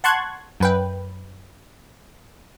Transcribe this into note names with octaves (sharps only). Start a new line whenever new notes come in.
F#5 A5 C6 C#6 F#6 G#6
F#2 B4 G5